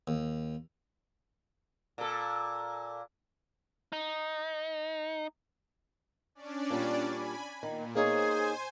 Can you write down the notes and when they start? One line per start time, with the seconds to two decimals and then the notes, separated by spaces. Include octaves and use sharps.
0.07 D#2
1.98 A#2 A4
3.93 D#4
6.35 C#4 D4 D5
6.70 A#2 G3
7.08 G#5 B5
7.63 A#2 D#3
7.95 A#3 D#4 G#4 C5 C#5 G#5